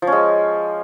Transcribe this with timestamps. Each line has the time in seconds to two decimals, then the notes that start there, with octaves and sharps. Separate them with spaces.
0.02 F3
0.07 C#4
0.12 G#3